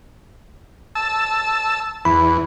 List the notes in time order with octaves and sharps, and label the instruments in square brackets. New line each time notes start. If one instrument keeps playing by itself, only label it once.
[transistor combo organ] A5 E6
[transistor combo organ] E2 [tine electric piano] B5